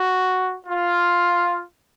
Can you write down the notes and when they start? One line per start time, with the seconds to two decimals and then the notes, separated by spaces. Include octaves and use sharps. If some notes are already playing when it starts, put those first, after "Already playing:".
Already playing: F#4
0.67 F4